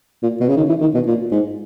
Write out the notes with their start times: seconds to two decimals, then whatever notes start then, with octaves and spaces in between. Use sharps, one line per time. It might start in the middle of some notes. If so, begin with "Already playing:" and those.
0.23 A#2
0.40 B2
0.49 C#3
0.57 D#3
0.69 E3
0.81 D#3
0.94 B2
1.07 A#2
1.32 G#2